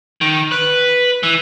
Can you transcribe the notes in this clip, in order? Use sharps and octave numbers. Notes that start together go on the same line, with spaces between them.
D#3
B4
E3